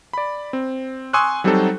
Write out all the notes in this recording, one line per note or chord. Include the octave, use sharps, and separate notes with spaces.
D5 B5
C4
G#5 C6 C#6 D#6 E6 F#6
F#3 G3 C4 D#4 F#4 A4